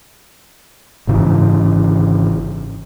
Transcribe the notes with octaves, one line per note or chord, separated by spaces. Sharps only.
G#1 G#2 C#3 E3